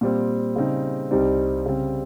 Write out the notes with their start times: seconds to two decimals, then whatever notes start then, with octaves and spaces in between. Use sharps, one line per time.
0.01 A#2 G3 C4
0.56 C#3 G3 C4 D#4
1.11 C2 C3 G3 C4 D#4
1.66 C#3 G3 C4